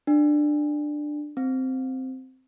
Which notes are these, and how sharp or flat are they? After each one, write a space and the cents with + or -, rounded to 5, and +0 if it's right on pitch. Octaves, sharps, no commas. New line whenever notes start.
D4 +15
C4 -5